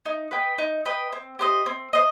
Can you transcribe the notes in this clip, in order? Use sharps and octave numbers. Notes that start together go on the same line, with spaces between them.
D#4
B4 D#5 G5
D#4
B4 D#5 G5
C4
G4 C5 D#5
C4
C5 D#5